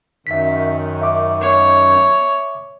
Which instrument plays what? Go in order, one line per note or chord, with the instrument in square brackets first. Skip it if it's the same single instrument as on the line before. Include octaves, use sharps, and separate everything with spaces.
[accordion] F#2 D#3 [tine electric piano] E5 B6
[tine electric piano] E5 D6
[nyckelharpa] C#5